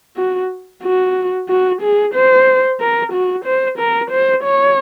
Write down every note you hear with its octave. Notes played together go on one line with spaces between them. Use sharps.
F#4
F#4
F#4
G#4
C5
A#4
F#4
C5
A#4
C5
C#5